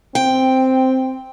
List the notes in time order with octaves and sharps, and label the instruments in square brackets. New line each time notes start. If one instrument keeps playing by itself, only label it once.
[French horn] C4 [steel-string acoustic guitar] G5